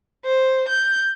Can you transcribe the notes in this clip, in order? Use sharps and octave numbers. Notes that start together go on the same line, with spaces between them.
C5
G6